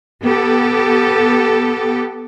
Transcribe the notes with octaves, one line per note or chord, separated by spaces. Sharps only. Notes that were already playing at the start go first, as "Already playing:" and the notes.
B3 G4 A4